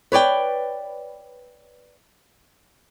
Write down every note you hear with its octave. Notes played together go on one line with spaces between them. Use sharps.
B4 C#5 D5 G5